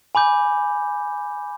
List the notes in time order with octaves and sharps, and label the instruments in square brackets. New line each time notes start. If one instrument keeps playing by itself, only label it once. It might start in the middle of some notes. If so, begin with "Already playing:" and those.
[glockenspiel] G#5 B5 D6 G6